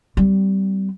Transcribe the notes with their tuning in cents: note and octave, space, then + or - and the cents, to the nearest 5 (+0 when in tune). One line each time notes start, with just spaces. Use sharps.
G3 -20 C4 -30